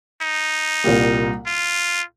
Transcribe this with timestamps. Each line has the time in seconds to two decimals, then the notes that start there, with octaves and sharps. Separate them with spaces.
0.22 D#4
0.84 C2 A#2 G3 A#3
1.46 F4